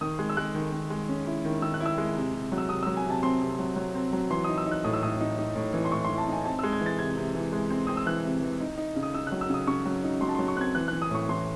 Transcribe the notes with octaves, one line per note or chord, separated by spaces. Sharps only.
D#3 D#6
G#3
E6
G#3 F#6
D#3
D#3
G#3
C#4
E4
D#3
D#3 E6
F#6
E4
E6
G#3
C3
C3
F#3
E6
C3 D#6
F#3 E6
G#5
C3 A5
C4 C6
C3
F#3
F#3
C4
F#3
E3 C6
D#4 D#6
E6
D#4
F#6
A2 D#6
E6
A2 D#6
D#4
D#4
A2
E3
C6
A2 C#6
E3 C6
A5
D#4 G#5
C4 A5
G#3 E6
G#6
E3
A6
C3 G#6
C3
E3
G#3
C4
C4 D#6
E6
E3 F#6
C3
E3
D#4
D#4
C#3
D#6
D#4 E6
F#6
F#3
E6
C#3 D#6
C#3 C#6
F#3
D#4
F#3 C6
A5
F#3 C6
C#6
C4 F#6 G#6
E3 F#6
E3 F#6
D#6
A2 C#6
E3 C6